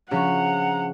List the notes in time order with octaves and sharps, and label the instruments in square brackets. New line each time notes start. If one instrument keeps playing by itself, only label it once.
[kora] C#3 F#4 [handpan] F3 C#4 D4 [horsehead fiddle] F#5 [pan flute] A#5